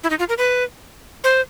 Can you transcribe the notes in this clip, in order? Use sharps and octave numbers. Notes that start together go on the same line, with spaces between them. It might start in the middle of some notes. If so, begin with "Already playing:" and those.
E4
D#4
F4
A#4
B4
C5